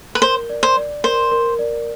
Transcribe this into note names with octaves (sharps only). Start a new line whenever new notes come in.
B4
A#4 C5
D5
C5
D5
A#4 C5
A#4
D5